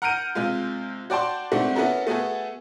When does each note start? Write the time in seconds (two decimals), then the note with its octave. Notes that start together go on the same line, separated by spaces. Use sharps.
0.02 F#5 A#5 F6 G6 D7 D#7
0.35 C3 G#3 F4
1.10 F#4 D5 G5 A5 C6
1.52 G#2 A3 C4 D4 F#4 G4
1.76 B3 C#4 E4 F#4 A4 A#4
2.07 A3 B3 F#4 G#4 A4